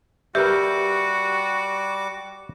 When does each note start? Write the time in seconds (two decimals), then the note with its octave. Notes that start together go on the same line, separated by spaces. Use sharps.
0.35 G3 F#4 G4 A#4 B4 E5 D6